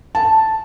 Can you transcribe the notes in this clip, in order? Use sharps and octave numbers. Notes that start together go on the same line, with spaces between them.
A5